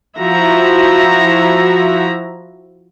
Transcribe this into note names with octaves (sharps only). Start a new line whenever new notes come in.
F3 E4 F#4 E5 A#5